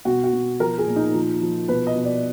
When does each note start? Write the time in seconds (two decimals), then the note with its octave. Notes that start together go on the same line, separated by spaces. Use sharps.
0.05 B2 F#4
0.24 F#4
0.33 B2
0.60 F3 A#4
0.78 G#4
0.87 A#2
0.96 D#4
1.14 F3
1.42 F3
1.68 B2 B4
1.87 D#5
1.96 B2
2.05 D5